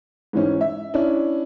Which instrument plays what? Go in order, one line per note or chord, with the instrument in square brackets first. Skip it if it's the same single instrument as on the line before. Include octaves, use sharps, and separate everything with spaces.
[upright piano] G#2 E3 C#4
E5
C#4 D4 E4